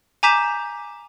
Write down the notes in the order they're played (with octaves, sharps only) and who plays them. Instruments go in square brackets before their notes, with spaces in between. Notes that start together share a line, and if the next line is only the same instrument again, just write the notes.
[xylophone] G#5 A#5 D6 G6 B6 E7